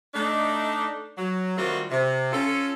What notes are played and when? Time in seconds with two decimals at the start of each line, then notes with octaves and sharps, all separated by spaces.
0.14 A3 D4 D#4
1.18 F#3
1.57 D#3 G3 A3 C4 F4 F#4
1.91 C3
2.32 C#4 F4 A4